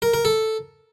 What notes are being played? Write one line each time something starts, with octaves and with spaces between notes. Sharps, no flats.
A#4
A#4
A4